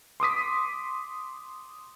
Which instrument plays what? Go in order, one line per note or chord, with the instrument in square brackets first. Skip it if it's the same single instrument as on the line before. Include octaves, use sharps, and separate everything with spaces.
[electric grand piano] C6 D6 D#6 B6